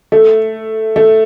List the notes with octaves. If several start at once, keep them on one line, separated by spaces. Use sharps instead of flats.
A3
A3